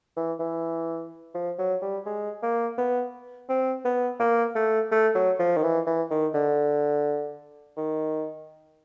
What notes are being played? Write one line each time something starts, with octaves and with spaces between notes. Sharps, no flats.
E3
E3
F3
F#3
G3
G#3
A#3
B3
C4
B3
A#3
A3
A3
F#3
F3
D#3
E3
E3
D#3
D3
D#3